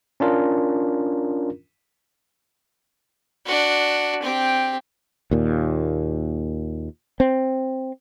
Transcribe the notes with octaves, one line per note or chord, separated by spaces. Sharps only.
C#4 D4 F4 A#4
D4 F#4
C4 G4
D#2 A#2
C4